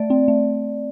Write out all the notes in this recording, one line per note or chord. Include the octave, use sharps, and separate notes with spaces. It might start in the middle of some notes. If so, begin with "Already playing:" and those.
Already playing: A3 D5
C4
A3